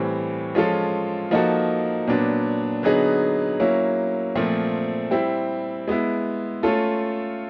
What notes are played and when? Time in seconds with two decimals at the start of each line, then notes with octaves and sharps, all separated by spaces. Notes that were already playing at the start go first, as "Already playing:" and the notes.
Already playing: A2 E3 G3 C4
0.55 F3 G#3 C#4 F4 A4
1.31 F3 A#3 D#4 F#4 A4
2.07 A#2 F#3 B3 D4
2.83 D3 F#3 B3 D#4 G#4
3.60 F#3 A#3 C#4 E4
4.35 A#2 F3 A3 C4
5.11 G3 C4 E4 G4
5.88 G#3 B3 E4
6.63 A3 C#4 F4 A4